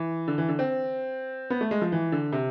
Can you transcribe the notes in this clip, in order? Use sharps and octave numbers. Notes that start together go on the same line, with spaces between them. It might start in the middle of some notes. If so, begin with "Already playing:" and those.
Already playing: E3
D3
E3
D3
C4
B3
A3
G#3
F3
E3
D3
C3